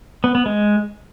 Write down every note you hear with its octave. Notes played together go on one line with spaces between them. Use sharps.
B3
B3
G#3